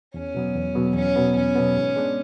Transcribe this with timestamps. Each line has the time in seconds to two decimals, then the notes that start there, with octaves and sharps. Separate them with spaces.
0.14 E2 C#4
0.35 B2 F#3 B3
0.55 E2
0.75 B2 F#3 B3
0.95 E2 C#4
1.16 B2 F#3 B3
1.36 E2 C#4
1.55 B2 F#3 B3
1.77 G#2
1.96 G#3 B3 D4